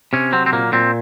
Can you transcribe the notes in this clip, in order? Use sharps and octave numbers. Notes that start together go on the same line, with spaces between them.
C3 C#4
F#3 C4
C4
A#2 A#3
A#2 C4